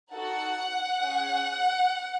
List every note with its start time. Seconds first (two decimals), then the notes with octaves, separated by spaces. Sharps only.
0.14 D#4 F#4 A4 F#5
1.02 C#4 G#4